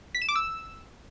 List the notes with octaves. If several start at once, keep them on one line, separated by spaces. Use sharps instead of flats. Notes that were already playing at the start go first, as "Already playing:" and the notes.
B6
E7
D6
E6